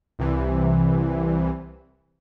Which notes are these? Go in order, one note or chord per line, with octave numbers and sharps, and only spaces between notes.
C2 C3 E3